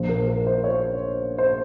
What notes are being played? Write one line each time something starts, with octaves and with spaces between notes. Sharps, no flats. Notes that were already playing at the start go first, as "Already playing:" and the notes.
Already playing: A#1 A#2 F3 C5
A#4
A#4
C5
C#5
C5